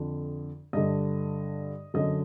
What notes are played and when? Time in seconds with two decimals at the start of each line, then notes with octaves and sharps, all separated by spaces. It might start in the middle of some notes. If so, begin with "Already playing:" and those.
Already playing: F2 D3
0.73 G2 D3 D#5
1.94 F#2 D3 D#5